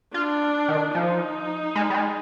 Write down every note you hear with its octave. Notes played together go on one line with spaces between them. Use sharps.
D4 F4
D#3
F3 D#4
G#3
G3
G#3